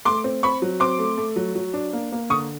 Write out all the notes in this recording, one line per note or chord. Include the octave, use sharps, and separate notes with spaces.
A3 C6 D6
C4
C4 B5 C#6
F#3
C4 C6 D6
A3
A3
F#3
F#3
D4
A#3
A#3
D3 C#6 D#6